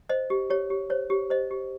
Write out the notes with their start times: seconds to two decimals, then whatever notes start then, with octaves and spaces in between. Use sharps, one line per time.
0.09 C5 D#5
0.30 G4
0.50 G4 C#5
0.70 G4
0.90 C5 C#5
1.10 G4
1.30 C5 D#5
1.51 G4